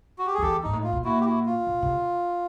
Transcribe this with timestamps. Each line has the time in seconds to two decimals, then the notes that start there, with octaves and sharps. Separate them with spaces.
0.19 F#4
0.26 G4
0.34 G#4
0.38 F2
0.42 E2 G4 A4
0.63 G#2 D#4
0.73 A2
0.84 F4
0.93 B2
1.04 A#2 E4 F#4
1.21 G4
1.25 E4 F#4
1.46 F4
1.67 B2
1.82 C3